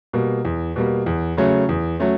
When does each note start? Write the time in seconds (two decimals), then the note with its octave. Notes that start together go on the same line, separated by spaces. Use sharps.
0.13 B2 G3 A#3
0.45 E2
0.76 B2 G3 A#3
1.06 E2
1.37 C#3 F#3 A3 C#4
1.69 E2
2.00 F#3 A3 C#4